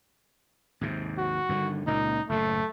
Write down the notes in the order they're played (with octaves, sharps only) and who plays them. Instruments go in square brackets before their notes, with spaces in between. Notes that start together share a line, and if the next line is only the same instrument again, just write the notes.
[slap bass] D#2 G#2 C3
[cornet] F#4
[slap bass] G2 D3 D#3
[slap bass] C#2 A#2 A#3 [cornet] D#4
[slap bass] F#1 A2 [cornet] A3